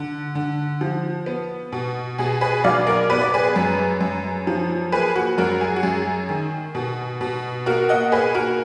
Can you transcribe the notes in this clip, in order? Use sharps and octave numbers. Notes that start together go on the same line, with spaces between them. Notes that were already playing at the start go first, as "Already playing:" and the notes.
Already playing: D3
D3
F3
B3
B2
B2 G#4
G#4 B4
F#3 D5 F5
A#4 D5
B3 B4
D5
G#4 B4
F#2
F#2
F3
A#3 G#4 B4
F#4
F#2 F#4 A#4
G#4
F#4
F#2 G#4
D#3
B2
B2
A#3 F#4 A#4
D#5 F#5
A#3 G#4 B4
F#4 A#4